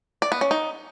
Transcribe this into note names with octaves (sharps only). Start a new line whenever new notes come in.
D5
B3
C#4
D#4